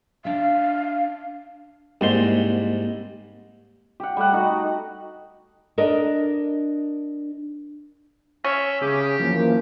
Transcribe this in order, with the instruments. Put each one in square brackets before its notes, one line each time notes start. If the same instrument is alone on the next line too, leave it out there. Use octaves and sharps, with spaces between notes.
[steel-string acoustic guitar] D4 E5 [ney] F5
[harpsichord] C2 G#2 C6 [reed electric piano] A#3 G4
[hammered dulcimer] G4 F#5
G3 A3 F#5
D#4 F#4
[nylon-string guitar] D4 A#4 D#5
[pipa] C#4 [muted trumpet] E5
[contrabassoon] C#3 [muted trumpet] G4 [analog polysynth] D6 D#6
[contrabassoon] F#2 [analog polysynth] E3 F3 A#3